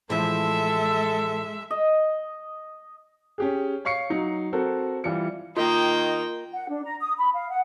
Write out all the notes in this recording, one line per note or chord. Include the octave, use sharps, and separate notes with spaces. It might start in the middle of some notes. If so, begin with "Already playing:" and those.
A2 E3 F3 G#3 A4 E5
D#5
C#4 G4 G#4
C#5 F5 C#6 C7 C#7
F#3 D#4
C4 F#4 A4 A#4
E3 G3 F4 C#7
D#3 A#3 F4 D#5 G5
F#5
D4
A#5
D#6
B5
F5
F#5